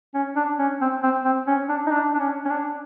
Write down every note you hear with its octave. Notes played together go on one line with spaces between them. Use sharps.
C#4
D4
C#4
C4
C4
C4
C#4
D4
D#4
D4
D4
C#4
C#4
D4